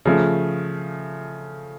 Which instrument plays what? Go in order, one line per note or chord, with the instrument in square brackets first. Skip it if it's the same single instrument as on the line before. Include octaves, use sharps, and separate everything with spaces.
[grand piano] C#3 F3 A3